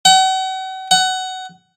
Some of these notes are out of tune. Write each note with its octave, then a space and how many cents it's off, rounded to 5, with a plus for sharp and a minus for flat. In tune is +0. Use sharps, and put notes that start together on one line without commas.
F#5 +40
F#5 +20